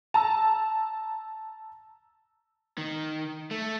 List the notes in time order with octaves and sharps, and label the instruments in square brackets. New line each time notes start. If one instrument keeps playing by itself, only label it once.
[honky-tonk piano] A5 A#5 E6
[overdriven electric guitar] D#3
A3